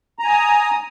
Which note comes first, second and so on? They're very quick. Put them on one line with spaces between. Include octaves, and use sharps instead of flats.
A#5 G#5 D#6